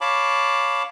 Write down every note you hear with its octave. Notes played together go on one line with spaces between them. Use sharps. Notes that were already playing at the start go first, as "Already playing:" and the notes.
C#5 F5 A5 B5 D6